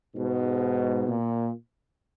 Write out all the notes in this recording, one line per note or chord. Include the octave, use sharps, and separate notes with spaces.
G#2 B2
A#2